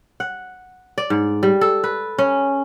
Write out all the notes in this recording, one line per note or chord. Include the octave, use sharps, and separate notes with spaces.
F#5
D5
G#2
G3
A4
B4
C#4